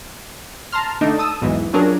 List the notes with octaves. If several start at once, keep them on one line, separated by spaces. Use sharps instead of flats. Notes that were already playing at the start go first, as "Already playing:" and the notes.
A5 A#5 C6 F6
D3 A3 D4 D#4
A5 D#6 E6
B1 E2 G#2 E3
F3 F#3 C#4 D4 G#4 A#4